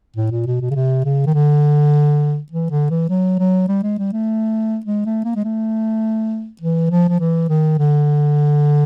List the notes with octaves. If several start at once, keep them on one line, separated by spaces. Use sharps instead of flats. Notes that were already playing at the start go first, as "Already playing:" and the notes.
A2
A#2
B2
B2
C#3
C3
C#3
D#3
D3
E3
D3
E3
F#3
F#3
G3
G#3
G3
A3
G#3
A3
A#3
G#3
A3
E3
F3
F3
E3
D#3
D3